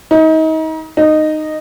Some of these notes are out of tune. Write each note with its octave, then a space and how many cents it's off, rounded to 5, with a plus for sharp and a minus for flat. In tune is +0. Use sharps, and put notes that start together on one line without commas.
D#4 +35
D#4 -10